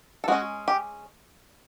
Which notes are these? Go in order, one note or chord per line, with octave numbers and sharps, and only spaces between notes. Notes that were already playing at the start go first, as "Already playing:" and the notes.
A4
G#3 C#4 F#4 G#4
G4